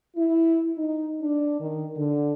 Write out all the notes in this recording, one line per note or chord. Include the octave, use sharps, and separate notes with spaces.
E4
D#4
D4
D#3
D3